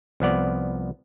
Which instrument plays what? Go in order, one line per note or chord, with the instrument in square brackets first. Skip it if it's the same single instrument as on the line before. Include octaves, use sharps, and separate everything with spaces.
[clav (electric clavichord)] C2 F3 B3 D5